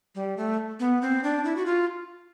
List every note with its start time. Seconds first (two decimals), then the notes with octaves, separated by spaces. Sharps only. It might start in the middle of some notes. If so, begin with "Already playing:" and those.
0.15 G3
0.37 A3
0.80 B3
1.02 C4
1.24 D4
1.45 E4
1.56 F#4
1.66 F4